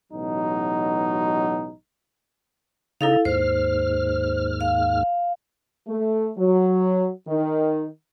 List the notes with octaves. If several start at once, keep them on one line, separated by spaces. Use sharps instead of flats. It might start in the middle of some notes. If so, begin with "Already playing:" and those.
A1 B2 F#3 D#4
C#3 D#4 E4 A4 F5
D#2 G#2 C5 F6
F5
A3
F#3
D#3